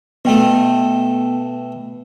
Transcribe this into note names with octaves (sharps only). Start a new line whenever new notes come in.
B2 A3 B3 G5